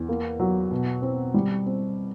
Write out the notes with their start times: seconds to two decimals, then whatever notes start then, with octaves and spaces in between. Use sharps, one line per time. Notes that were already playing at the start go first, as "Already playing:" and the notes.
Already playing: E2
0.09 A#3
0.39 F#3
0.71 B2
1.02 C4
1.34 G3
1.66 C4